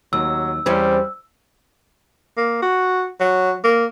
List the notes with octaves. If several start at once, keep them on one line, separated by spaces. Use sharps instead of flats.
D#2 F#3 E6
E2 G3 C4 C#4
A#3
F#4
F#3
A#3